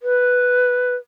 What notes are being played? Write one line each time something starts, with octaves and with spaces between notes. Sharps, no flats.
B4